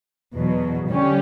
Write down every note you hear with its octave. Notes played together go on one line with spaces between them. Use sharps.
E2 B2 F#3
D3 G3 C#4 G4